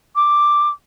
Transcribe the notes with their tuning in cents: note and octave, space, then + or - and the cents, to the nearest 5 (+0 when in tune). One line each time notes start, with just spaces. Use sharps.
D6 +5